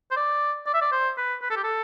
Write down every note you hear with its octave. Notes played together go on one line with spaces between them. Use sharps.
C5
D5
D5
E5
D5
C5
B4
B4
A4
G4
A4